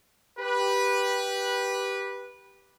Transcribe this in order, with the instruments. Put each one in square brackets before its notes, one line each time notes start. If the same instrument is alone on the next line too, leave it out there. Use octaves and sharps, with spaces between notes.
[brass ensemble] G4 B4